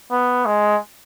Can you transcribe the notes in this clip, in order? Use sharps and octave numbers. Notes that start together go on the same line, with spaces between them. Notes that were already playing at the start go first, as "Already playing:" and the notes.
B3
G#3